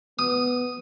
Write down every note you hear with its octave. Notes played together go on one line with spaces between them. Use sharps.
B3 D#6